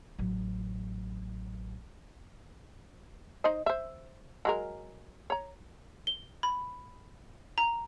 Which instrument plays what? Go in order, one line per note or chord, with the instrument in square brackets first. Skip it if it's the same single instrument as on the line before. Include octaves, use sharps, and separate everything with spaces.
[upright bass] A1 F#3
[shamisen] D#4 C5 D#5
C5 E5
F#3 G#3 A#4
C#5 A#5
[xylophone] G7
B5
A#5